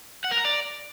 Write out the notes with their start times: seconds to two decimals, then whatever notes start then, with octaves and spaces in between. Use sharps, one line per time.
0.24 F#5
0.31 A#4
0.38 A#5
0.45 D5